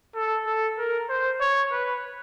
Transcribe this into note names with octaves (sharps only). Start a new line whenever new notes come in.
A4
A4
A#4
C5
C#5
B4